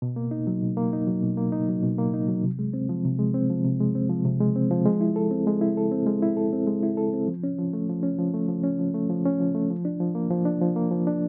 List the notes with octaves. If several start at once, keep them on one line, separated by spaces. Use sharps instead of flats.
B2
A#3
D#4
F#3
B2
A#3
D#4
F#3
B2
A#3
D#4
F#3
B2
A#3
D#4
F#3
C3
G#3
C4
F3
C3
G#3
C4
F3
C3
G#3
C4
F3
C3
G#3
C4
F3
G#3
E4
A4
C4
G#3
E4
A4
C4
G#3
E4
A4
C4
G#3
E4
A4
C4
F3
C#4
F3
A3
F3
C#4
F3
A3
F3
C#4
F3
A3
F3
C#4
F3
A3
F3
D4
F3
A#3
F3
D4
F3
A#3
F3
D4